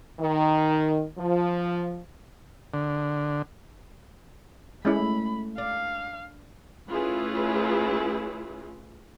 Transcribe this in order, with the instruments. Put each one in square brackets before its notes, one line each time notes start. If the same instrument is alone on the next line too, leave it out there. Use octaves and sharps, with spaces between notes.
[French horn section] D#3
F3
[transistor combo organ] D3
[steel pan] G#3 C#4 E4 [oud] A3 [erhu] B5
[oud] D4 [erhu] F5
[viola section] A3 C#4 E4 F4 G#4 B4